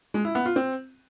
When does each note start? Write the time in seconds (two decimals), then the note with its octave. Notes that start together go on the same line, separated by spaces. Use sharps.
0.14 G#3
0.25 E4
0.35 B3
0.46 F4
0.56 C4